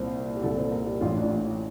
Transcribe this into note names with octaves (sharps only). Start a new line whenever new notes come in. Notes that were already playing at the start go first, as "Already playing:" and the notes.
Already playing: C2 A#2 C5
G4
C2 A#2 A4
C5
A#4
G4
A1 A2 F4
D4